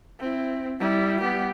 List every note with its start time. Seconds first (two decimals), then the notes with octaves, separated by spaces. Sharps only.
0.20 C4 E4
0.79 G3 E4
1.21 B3 G4